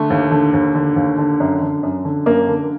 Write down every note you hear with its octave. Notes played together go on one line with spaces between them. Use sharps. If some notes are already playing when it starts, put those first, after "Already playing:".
Already playing: D3 A3
D#2
D3
D#2
D3
D#2
D3
F#2
D3
F#2
D3
F#2 A#3
D3